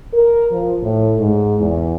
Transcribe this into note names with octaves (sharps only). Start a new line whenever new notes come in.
A#4
F3
A2
G#2
E2